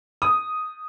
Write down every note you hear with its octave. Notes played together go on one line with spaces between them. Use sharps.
D#6